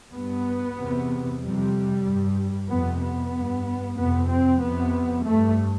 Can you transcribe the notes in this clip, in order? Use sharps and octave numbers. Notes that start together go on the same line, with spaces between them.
G2 B3
E2 C3
F2 C3 G3
G2
F2 C3 B3
B3
G2
F2 C3 B3
C4
F2 C3 B3
G2 A3